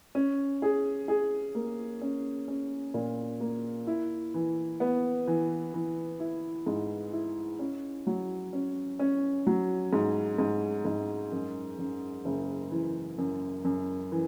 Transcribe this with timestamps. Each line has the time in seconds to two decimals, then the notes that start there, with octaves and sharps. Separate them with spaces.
0.15 C#4
0.62 G#4
1.08 G#4
1.55 A#3
2.01 C#4
2.48 C#4
2.94 A#2
3.40 A#3
3.87 E4
4.34 E3
4.80 B3
5.27 E3
5.74 E3
6.20 E4
6.67 G#2
7.13 E4
7.59 C#4
8.07 F#3
8.53 C#4
8.99 C#4
9.47 F#3
9.93 G#2
10.38 G#2
10.85 G#2
11.32 F#2
11.79 F#2
12.25 F#1
12.71 E3
13.18 F#2
13.65 F#2
14.12 E3